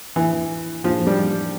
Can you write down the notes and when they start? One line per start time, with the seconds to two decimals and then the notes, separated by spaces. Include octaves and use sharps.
0.16 E3
0.84 F3
1.07 G3